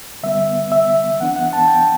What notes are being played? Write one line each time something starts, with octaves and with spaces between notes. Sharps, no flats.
D3 G3 B3 E5
E5
E3 B3 D4 F#5
F#5
A5
G5